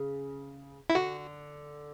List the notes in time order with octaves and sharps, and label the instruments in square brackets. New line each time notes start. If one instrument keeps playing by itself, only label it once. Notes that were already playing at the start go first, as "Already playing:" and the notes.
Already playing: [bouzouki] C#3
[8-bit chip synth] E4
[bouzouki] D3 [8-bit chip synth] F#4